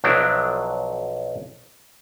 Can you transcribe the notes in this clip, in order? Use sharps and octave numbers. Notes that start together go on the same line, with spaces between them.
B1 F3 F#3 D4 E4